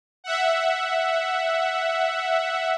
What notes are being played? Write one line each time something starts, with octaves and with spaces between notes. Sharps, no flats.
E5 F#5